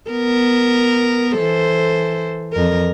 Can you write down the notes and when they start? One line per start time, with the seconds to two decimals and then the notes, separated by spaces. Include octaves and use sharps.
0.11 B3 A#4
1.36 E3 A4 C5
2.52 F2 A#4